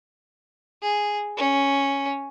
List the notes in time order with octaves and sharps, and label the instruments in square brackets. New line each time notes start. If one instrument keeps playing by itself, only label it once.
[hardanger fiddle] G#4
C#4